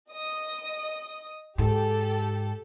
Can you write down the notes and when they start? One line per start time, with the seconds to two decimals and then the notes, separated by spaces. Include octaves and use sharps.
0.10 D#5 D#6
1.58 G#2 G4 A4